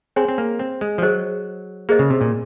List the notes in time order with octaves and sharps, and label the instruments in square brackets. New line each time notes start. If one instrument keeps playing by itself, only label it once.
[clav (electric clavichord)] C4 [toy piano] G#4 C#5 G#5 C6
[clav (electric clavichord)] C4
A#3
C4
G#3
F3
[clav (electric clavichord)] F#3 [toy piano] G#4 C5 D#5
[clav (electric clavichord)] A#3 [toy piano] G#4 C5 D#5
[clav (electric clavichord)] C#3
C3
A#2